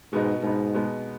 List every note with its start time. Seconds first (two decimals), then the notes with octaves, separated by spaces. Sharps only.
0.12 G#2 B2 G#3 B3 D#4
0.43 G#2 B2 G#3 B3 D#4
0.74 B2 G#3 B3 D#4